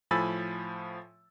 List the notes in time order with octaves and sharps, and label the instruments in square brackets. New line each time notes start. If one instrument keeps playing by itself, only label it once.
[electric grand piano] A2 F3 G#5 B5 E6 A6